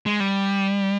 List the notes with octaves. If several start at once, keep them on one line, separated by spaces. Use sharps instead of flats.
G#3
G3